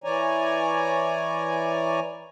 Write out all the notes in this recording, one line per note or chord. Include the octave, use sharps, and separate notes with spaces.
E3 C#5 D5 G#5 A#5